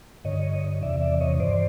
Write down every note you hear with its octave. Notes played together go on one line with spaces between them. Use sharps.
G2 D3 C#5 D#5
E2 C3 E3 D5 E5
D5 E5
C#5 D#5
G2 E3 C5 D5